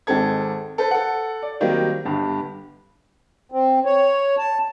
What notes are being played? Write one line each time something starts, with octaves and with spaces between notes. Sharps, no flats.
G#1 G#3 C4 A4 G#6
A4 B4 C5
A4 F#5
D5
D#3 F#3 G3 A#3 C4
G1 G2
C4
C#5
A5